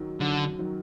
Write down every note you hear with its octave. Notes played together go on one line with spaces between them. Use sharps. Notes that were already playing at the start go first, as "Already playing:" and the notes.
Already playing: F#2 D#3 F#3
F#2 D3
D#3 F#3